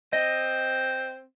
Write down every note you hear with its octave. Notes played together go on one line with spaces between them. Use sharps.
C4 D#5